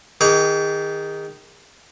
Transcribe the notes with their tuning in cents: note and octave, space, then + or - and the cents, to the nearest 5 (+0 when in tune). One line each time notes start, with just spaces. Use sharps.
D#3 +0 G#4 -35 C#6 +45